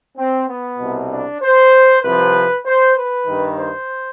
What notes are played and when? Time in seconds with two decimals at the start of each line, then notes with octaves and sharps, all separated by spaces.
0.18 C4
0.48 B3
0.79 C2 B2
1.10 D4
1.42 C5
2.03 C2 C3 F3 B4
2.66 C5
2.96 B4
3.27 G2 D#3
3.58 C5